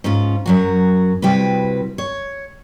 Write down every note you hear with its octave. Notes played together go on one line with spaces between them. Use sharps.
G#2 C#4 F4
F#2 F#3 F#4
C3 G3 E4 F#4 B4
C#5